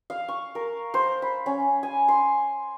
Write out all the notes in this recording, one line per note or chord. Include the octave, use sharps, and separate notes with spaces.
F5
C#6
A#4
C5
B5
C#4
G#5
C6